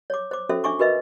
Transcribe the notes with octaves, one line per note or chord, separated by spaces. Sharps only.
C#5 D6
C5 D6
C#4 F#4 A4 C5 E5
D4 E5 G#5 C#6 D6
F#4 A#4 B4 D#5 E5